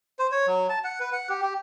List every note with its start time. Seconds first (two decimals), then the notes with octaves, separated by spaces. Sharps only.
0.19 C5
0.32 C#5
0.47 F#3
0.69 A5
0.84 F#5
1.00 B4
1.13 F#5
1.29 G4
1.42 G4